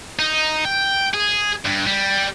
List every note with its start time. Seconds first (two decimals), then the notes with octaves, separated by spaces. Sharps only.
0.19 D#4
0.65 G5
1.14 G#4
1.65 G2
1.86 G3